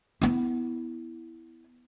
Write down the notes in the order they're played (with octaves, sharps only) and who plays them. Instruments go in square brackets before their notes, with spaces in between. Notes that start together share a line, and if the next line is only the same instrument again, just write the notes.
[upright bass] B3 E4